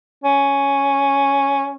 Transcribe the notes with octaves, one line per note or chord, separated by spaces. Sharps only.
C#4